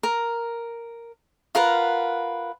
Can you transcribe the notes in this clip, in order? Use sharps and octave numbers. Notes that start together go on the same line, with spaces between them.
A#4
F4 A#4 B4 F#5